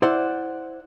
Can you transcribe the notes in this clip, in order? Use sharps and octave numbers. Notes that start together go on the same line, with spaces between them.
E4 C5 D5 F#5